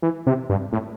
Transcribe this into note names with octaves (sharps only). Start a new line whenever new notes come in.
E3
C3
G2
A2